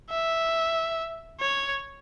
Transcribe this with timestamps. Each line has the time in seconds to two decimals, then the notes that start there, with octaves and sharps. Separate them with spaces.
0.10 E5
1.40 C#5